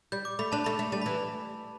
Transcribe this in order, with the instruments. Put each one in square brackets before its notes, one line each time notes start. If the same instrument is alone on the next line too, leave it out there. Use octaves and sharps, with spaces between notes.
[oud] G3 [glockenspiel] G6
[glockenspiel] D6
[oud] A3 [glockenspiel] B5
[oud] D4 [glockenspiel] A5
[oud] A3 [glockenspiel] B5
[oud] A3
[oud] G3 [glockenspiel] A5
[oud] E3 [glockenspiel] B5